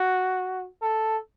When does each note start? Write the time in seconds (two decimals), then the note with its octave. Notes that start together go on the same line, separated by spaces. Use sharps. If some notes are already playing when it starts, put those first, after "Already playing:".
Already playing: F#4
0.82 A4